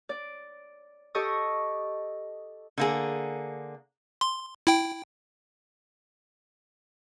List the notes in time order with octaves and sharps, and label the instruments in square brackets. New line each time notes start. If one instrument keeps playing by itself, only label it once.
[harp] D5
G4 A4 D#5 C#6 D#6
[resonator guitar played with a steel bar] D3 A#3 G#4
[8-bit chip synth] C6
E4 G5